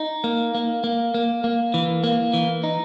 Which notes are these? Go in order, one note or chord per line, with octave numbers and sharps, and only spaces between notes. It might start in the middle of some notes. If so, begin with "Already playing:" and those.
Already playing: D#4
A#3
A#3
A#3
A#3
A#3
E3
A#3
E3
D#4